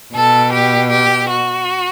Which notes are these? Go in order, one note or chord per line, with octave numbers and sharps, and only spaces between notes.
B2 A4
G4
G4
F#4